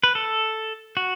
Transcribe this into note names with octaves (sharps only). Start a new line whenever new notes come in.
B4
A4
F#4